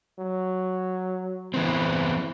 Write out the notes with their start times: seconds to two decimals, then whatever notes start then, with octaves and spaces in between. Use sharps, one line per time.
0.19 F#3
1.54 E3 B3 C4